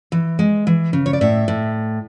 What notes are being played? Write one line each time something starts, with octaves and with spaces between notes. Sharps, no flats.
E3
G#3
E3
C#3
C#5
D5
A2 E5
A2